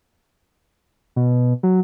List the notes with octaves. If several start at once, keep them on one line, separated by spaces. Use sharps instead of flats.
B2
F#3